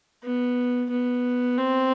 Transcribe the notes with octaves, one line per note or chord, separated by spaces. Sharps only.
B3
B3
C4